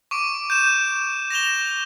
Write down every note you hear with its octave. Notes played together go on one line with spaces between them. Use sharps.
C#6 D6 D7
G6 E7
A#6 E7 F7 G7